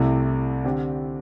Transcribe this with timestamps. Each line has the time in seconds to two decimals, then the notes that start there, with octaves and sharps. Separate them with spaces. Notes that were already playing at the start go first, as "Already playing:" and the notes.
Already playing: C2 C3 A3 E4
0.64 D3 C4 G4